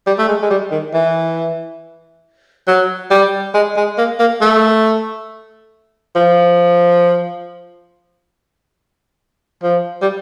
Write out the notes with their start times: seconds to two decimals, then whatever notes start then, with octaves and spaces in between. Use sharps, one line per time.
0.07 G3
0.19 A3
0.28 G#3
0.42 G#3
0.50 G3
0.72 D#3
0.94 E3
2.68 F#3
3.11 G3
3.55 G#3
3.77 G#3
3.98 A#3
4.20 A#3
4.41 A3
6.16 F3
9.63 F3
10.02 G3